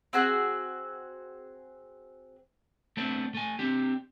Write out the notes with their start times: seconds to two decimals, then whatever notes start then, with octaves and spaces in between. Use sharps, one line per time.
0.13 C4 F#4 G#4 F#6
2.97 A3 B3 C4 D4
3.35 A3 G#5
3.59 C4 D4 G4